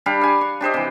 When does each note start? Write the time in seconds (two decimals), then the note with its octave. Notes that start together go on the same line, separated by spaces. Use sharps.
0.06 G3 D4 G4 F5
0.21 F5 G#5
0.41 C#6
0.61 D4 G4 C5 D#5
0.74 C3 E3